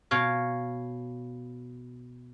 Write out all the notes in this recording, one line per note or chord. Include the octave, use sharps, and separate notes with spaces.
B2 C#5 F5